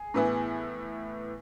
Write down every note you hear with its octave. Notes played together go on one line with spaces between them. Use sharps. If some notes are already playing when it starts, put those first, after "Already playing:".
Already playing: G#4
A2 E3 B3 E4